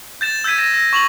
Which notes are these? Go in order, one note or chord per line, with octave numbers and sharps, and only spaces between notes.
G6 A6 E7
E6 G6 G#6 B6 D#7
A6 A#6 E7
E6 A#6
C#6 F7 F#7